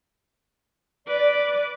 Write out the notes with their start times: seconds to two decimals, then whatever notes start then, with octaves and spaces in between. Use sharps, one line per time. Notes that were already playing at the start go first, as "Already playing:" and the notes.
1.08 B4 D5 D6